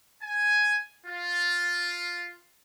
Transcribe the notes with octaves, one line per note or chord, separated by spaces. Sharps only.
G#5
F4